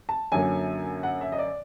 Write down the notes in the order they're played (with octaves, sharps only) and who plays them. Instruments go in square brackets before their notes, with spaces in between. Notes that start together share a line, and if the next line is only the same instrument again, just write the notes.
[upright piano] A5
F#2 D3 F#3 A#3 G#5
F#5
E5
D#5
D5